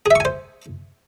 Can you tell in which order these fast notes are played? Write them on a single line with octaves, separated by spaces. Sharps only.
G#4 E5 C#6 G#5 C5